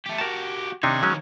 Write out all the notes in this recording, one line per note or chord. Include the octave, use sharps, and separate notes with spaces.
A3 G4
F#4 G4 A#4 A5
C3 D#3 D4 D#4 C#5
F#3 G#3 C#4